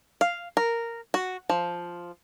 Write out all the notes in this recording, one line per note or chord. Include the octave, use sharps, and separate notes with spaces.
F5
A#4
F#4
F3